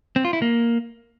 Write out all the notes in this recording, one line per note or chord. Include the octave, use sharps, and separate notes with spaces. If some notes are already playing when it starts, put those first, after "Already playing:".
C4
F4
E4
A#3